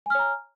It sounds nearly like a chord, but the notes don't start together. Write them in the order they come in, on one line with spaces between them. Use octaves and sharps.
G#5 F6 C#5 A#5